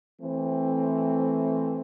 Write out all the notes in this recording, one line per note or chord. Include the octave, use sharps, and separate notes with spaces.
E3 A3 C4